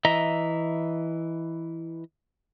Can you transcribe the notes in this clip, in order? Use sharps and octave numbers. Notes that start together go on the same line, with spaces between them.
E3 D#5 E5 A#5